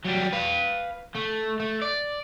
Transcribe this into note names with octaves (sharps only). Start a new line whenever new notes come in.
F#3 G3
B4 F5
A3
A3
D5